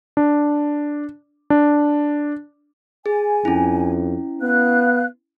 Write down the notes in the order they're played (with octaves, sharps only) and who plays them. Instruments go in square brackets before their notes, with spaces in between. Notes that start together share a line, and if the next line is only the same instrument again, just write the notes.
[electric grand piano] D4
D4
[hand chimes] G#4 [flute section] G#5
[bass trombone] F2 [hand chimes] C#4 E4
[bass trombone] B3 [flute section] F5 F#6